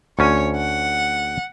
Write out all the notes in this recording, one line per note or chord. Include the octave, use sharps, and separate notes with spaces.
D2 C#4 C#5 G#5
F#5